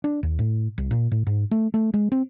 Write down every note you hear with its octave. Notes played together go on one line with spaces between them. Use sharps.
D4
D#2
A2
C2
A#2
A2
G#2
A3
A3
G#3
C4